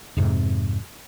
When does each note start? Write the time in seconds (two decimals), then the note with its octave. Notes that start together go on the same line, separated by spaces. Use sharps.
0.17 F2 G#2 C3